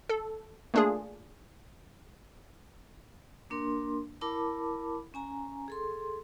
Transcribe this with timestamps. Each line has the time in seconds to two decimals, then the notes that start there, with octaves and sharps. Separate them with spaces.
0.09 A4
0.74 A3 A#3 D4 F4 G#4
3.50 A#3 D4 A#4 C6
4.21 E4 A#4 A5 B5 D6
5.14 C#4 G#5 A#5
5.68 G#4 A4 C6